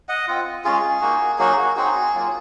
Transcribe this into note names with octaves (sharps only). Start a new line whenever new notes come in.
D#5 F#5
C4 F4
G#3 C#4 F4 G#4
A#3 D#4 F#4
F#3 A#3 D#4 F#4 G#4
F#4
C4 D#4 F#4 G#4
F#3 A#3 F4